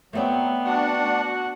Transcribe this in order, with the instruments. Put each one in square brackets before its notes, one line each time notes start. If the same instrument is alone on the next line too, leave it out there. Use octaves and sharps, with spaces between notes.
[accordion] F#3 [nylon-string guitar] A3 C4 D5 [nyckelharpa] B3
[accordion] D4 [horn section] F#4 F#5